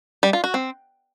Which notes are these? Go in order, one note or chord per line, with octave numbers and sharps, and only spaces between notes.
G3
F4
F#4
C4